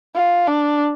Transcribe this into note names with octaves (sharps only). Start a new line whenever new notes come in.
F4
D4